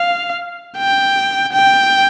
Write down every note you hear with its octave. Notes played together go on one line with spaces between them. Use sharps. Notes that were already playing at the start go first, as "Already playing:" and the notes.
Already playing: F5
G5
G5